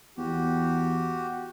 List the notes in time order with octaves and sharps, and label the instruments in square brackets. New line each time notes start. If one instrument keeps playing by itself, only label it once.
[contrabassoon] E2 [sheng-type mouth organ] F#4 G4